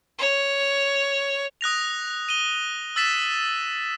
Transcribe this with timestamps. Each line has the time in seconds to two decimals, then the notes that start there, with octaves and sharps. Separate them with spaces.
0.18 C#5
1.61 D#6 F#6 A#6 F7
2.29 D#7 G7
2.96 E6 A6 B6 E7